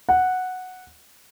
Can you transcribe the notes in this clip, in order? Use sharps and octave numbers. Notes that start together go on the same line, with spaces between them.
F#5